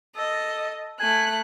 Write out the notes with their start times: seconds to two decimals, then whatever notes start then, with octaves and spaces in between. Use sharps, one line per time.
0.17 A4 D#5
1.00 A3 G#5 F#6